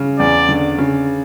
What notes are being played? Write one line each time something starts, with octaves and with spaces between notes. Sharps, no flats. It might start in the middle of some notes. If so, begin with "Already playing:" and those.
Already playing: C#3
E2 D5
D3
C#3